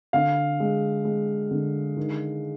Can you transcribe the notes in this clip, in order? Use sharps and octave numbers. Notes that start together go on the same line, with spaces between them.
D3 F5
G#3
G#3
D3
D#3